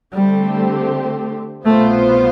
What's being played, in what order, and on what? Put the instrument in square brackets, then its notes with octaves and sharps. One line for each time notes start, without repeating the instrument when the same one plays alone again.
[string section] D3 A3 C4 G4 [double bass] G3
[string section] C2 B2 B3 F4 C5 [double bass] A3